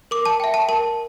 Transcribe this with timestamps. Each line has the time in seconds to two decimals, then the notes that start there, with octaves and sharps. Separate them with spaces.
0.11 A#4 D6
0.25 A5
0.40 E5 G5
0.54 A5
0.69 A#4 A5